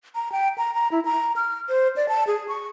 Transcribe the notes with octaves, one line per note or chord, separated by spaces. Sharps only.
A#5
G5
A#5
A#5
E4
A#5
F6
C5
D5
A5
G#4
C#6